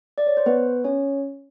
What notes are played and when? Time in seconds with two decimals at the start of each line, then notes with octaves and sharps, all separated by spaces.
0.18 D5
0.27 C#5
0.37 C5
0.46 B3 B4
0.84 C#4 C#5